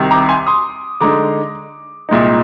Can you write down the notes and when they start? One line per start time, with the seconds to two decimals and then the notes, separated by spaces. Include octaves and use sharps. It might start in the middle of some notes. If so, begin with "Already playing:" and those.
Already playing: C2 C3 D#3
0.11 A#5 D6
0.29 G#5 C6
0.47 C6 D#6
1.01 D3 G#3 D#4 A#5 D6
2.09 C2 A#2 G#3 D#4